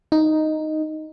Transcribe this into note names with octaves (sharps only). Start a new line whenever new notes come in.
D#4